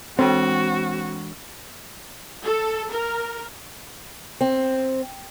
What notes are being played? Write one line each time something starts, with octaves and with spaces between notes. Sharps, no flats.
E3 G#3 C4 D4 F#4
A4
A#4
C4